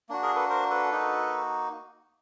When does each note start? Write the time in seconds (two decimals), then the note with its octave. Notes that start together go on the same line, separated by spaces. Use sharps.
0.09 A#3 D4 F#4
0.23 G#4 A#4
0.35 A4 B4
0.50 A#4 C5
0.70 A4 B4
0.91 A#3 D#4 F#4